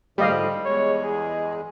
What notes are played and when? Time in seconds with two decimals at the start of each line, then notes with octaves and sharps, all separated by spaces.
0.18 G#2 D3 F3 G3 G4 D#5 F5
0.65 E2 G#3 C#5
1.04 G#4